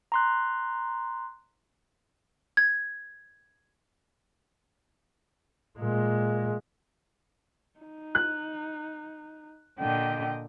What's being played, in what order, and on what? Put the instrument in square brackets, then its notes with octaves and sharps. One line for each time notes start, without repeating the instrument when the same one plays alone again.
[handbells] A#5 C6 F#6
[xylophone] G#6
[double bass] A#2 G#3
[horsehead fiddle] D#4
[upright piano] F#6
[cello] A#2 D3 [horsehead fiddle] D#5 G5